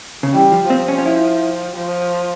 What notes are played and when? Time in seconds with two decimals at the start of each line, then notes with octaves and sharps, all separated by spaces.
0.23 C#3
0.34 E3 G3
0.52 F3
0.70 F3 C4
0.88 C#4
0.99 C#4
1.06 E4
1.76 F3